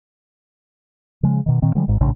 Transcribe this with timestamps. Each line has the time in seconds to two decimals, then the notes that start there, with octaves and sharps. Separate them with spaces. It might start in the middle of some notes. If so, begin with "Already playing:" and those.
1.23 C#3 F3 G#3
1.46 B2 D#3
1.62 A#2 D#3 C4
1.75 D3 F3 G3 G#3
1.88 G#1 G#2
2.01 A#1 A2 C#3 D4